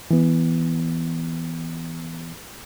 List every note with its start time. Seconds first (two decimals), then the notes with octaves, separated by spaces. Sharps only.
0.11 E3 B3